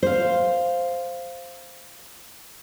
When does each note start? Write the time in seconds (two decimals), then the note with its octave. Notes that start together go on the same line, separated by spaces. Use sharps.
0.03 C5 F5